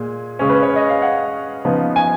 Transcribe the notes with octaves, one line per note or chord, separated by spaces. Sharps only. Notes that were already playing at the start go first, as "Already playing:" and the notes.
Already playing: A#2 G#3
C#3 G#3 C#4
B4
C#5
D#5
F5
F#5
C#3 F3 B3 D#4
G#5